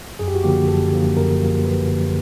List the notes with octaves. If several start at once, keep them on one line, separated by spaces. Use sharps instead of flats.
F#2 G#4
G4
F#4
D3 F3 A#3 G4
F#2 A4
D3 F3 A#3
F#2 A#4
D3 F3 A#3
F#2 B4
D3 F3 A#3